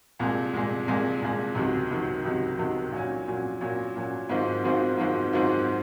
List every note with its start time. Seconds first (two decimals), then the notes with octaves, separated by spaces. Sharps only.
0.19 C2 A#2 G#3
0.53 C2 A#2 G#3
0.87 C2 A#2 G#3
1.22 C2 A#2 G#3
1.55 C#2 C3 D#3 F#3
1.90 C#2 C3 D#3 F#3
2.25 C#2 C3 D#3 F#3
2.58 C#2 C3 D#3 F#3
2.92 A#2 F#3 C#4
3.26 A#2 F#3 C#4
3.61 A#2 F#3 C#4
3.96 A#2 F#3 C#4
4.29 G#2 D#3 F#3 C4 F4
4.64 G#2 D#3 F#3 C4 F4
4.97 G#2 D#3 F#3 C4 F4
5.33 G#2 D#3 F#3 C4 F4